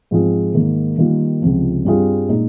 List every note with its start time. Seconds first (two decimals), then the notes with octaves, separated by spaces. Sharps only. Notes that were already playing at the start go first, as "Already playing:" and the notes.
0.11 G#2 F3 C4 F4 G#4
0.54 G#2 D#3 A#3
0.98 D#3 G3 A#3 F4
1.42 C#2 C3 F3
1.85 G2 G3 C4 F4 G#4
2.29 A#2 G#3 D#4